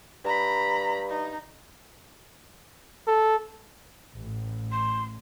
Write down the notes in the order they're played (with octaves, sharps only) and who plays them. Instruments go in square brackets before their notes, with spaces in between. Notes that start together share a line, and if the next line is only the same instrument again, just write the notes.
[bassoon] G2 [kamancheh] A#5 B5
[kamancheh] D#4
[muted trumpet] A4
[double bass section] A1 A2
[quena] C6